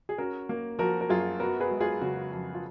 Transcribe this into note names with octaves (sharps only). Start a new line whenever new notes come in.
G#4
C#4 F#4 A#4
A#3
F3 F#4 A#4
A#4
F#2 F4 G#4
B3 F#4 A#4
G#4 B4
G#3
F4 G#4
C#3 F#4
F2 F#4
F4